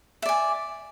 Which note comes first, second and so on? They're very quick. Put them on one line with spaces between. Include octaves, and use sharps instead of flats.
E5 D5 G#5